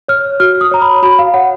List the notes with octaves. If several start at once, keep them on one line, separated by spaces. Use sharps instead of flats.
C#5 F6
F#4 F6
D#6
C#5 A#5
B5
F#4 B5
F5
C#5 F#5